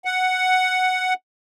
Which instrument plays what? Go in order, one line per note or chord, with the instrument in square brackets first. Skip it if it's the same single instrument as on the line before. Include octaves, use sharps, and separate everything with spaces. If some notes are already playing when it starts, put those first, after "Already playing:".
[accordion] F#5